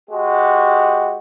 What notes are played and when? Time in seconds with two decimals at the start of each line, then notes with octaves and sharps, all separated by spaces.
0.11 G#3 F#4 G4